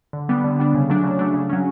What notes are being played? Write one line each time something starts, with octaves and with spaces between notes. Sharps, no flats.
D3
G3 B3 D4
D3
G3 B3 D4
C#3
F#3 A3 D4
C#3
F#3 A3 D4
C#3
F#3 C#4